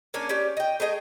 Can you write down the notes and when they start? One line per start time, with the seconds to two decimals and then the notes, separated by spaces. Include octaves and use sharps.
0.14 A#3 C#4 D4 G#5
0.29 C#4 G4 D5
0.57 D#5 G5
0.80 A3 G#4 D#5 G5